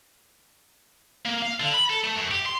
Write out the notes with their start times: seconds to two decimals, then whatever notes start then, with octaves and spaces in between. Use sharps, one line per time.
1.26 A#3
1.42 F5
1.60 D3
1.74 B5
1.90 A4
2.04 A3
2.16 F#2
2.31 G4
2.46 C6